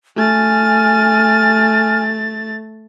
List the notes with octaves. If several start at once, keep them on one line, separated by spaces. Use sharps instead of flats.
A3 G#5 F6 A6